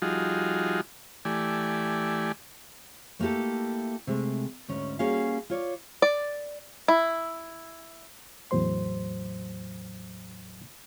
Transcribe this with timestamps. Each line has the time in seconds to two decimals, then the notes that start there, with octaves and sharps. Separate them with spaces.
0.02 F3 G3 D#4 F4 F#4 G#4
1.25 E3 A3 G4 D5 G#5
3.19 A3 A#3 E4 G4 A4
4.07 C3 G#3 A3
4.68 D2 G#2 C#4
4.99 G3 A#3 C#4 F#4 G#4 F5
5.50 F4 C#5 D5
6.02 D5
6.88 E4
8.51 E2 A2 F#3 C5 C6